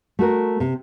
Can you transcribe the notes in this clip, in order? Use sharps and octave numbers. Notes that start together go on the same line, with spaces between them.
A3 F#4 A#4
C3